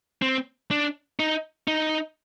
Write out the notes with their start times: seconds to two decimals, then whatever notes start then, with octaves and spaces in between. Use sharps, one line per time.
0.22 C4
0.71 D4
1.19 D#4
1.67 D#4